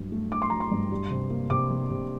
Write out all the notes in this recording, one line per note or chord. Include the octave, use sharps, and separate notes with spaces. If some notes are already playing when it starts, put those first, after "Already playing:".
Already playing: G2 F#3
A3
D4 D6
C6
F#3 A#5
C6
G2
G3
C3
A#3
C3 D6
G3
C3